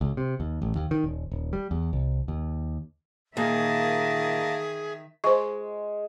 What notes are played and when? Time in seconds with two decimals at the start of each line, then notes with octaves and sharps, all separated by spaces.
0.01 C#2
0.17 C3
0.40 D#2
0.62 A1
0.76 D#2
0.91 D#3
1.04 D#1
1.32 D#1
1.53 G3
1.71 E2
1.93 C2
2.28 D#2
3.37 A#2 D#3 A#3 G#4 D#5 E5 A5
5.24 G#3 C5 C#6